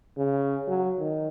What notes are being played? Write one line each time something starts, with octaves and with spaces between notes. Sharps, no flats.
C#3
F#3
D#3